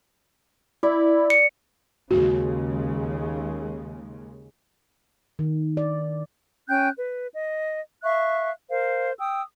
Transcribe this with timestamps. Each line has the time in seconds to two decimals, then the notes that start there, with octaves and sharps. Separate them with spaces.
0.83 E4 D5
1.30 C#7
2.11 D#2 C#3 G#3 F#4
5.39 D#3
5.77 D5
6.68 C#4 G5 F#6 G6
6.97 B4
7.32 D#5
8.03 E5 F5 C#6 F#6
8.69 A#4 C5 F5
9.18 G5 D#6 E6